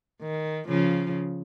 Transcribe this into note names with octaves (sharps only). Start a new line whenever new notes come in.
D#3
C#3 F3